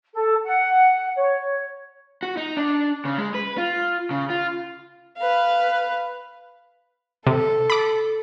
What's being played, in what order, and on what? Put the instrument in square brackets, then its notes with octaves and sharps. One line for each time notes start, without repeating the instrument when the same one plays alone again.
[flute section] A4
F#5
C#5
[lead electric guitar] F#4
D#4
D4
C#3
G#3
B4
F4
C#3
F4
[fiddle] B4 F5
[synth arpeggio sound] C3 [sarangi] A4
[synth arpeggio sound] B5 D6